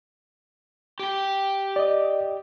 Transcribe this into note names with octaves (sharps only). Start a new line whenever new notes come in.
G4 G5
D5 D#5